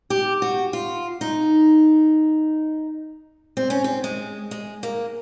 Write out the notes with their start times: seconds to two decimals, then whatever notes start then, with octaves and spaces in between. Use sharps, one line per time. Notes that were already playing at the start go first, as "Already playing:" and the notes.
0.10 G4
0.42 F#4
0.73 F4
1.21 D#4
3.57 C4
3.70 C#4
3.84 C4
4.04 G#3
4.51 G#3
4.83 A#3